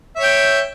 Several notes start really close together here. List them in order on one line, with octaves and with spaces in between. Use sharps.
E5 C#5 G5